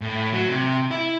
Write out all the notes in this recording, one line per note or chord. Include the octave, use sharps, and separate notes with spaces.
A2
F#3
C3
E4